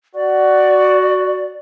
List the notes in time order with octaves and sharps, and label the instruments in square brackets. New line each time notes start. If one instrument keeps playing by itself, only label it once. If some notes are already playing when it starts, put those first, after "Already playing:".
[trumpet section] F#4 [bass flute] D5